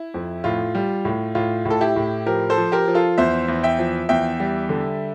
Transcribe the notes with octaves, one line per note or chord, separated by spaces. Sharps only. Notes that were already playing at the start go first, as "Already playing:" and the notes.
Already playing: E4
F2
A2 F4
G3
A2
A2 F4
A2
A4
E4 G4
A2
F3 G4 A#4
A4 C5
F3
G4 A#4
F3
F4 A4
E2 C5 E5
E2
E5 G5
F3
E2 E5 G5
G3
D3